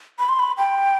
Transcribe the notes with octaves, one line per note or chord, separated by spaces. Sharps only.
B5
C6
B5
G5